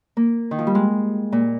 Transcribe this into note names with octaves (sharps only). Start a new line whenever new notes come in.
A#3
D#3
F3
G3
G#3
A#2